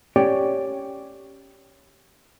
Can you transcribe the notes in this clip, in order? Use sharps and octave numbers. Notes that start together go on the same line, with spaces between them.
C#4 G4 C#5 D5 G5